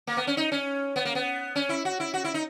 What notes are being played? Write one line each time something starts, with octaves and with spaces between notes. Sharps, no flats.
A#3
B3
C#4
D#4
C#4
B3
A#3
B3
C#4
E4
F#4
E4
F#4
E4
D#4